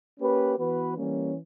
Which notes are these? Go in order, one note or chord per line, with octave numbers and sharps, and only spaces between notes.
A#3 C#4 G4 B4
E3 B3 F#4 B4
E3 G3 A#3 C#4